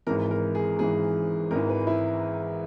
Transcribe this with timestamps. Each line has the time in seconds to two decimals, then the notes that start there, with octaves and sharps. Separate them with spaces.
0.07 G#1 G#2 E3 A#4
0.31 A#4
0.55 G#4
0.79 G#1 G#2 E3 G#4
1.51 G#1 G#2 E3 A#4
1.69 B4
1.87 E4